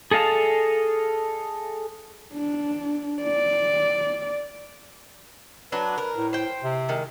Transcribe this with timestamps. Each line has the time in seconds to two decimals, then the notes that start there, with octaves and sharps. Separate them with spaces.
0.11 G#4 A4 D#5 F5 A5
2.34 D4
3.23 D5
5.72 F#3 D4 B4
5.98 A#4
6.17 A2
6.33 C5 G5
6.63 C3
6.89 D#3 G#3